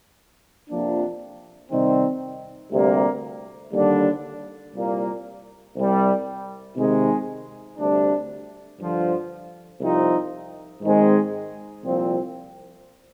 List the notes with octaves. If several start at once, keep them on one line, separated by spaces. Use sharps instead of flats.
F2 C3 F3 A#3 D4
C3 D#3 G3 C4
D2 C3 G3 A#3
D#2 D3 G3 D4
C2 A#2 G3 A#3
C2 C3 G3
C3 D#3 G#3
D2 C3 G3 D4
G2 D3 F3
C2 C3 F3 C4 D#4
G#2 D#3 G#3 C4
C2 A#2 F3 C4